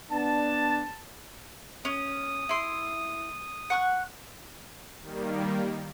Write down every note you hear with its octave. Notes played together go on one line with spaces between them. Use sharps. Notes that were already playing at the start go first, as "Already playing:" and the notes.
B3 D4 A5
C#4 D#6
E4 C6
F#5 C#6 F#6
D#3 G3 A#3